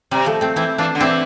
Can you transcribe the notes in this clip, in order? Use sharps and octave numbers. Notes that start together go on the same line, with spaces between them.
C3 G3
F3 A3
A3 C4
E3 C4 E4
E3 D4 F4
D3
E3 C4 E4